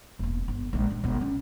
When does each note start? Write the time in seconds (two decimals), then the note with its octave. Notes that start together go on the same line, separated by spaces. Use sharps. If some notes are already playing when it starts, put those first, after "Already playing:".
0.19 E1 A#3
0.48 G1
0.73 A#1 G#3
0.90 D4
1.04 G1 B2
1.21 C#4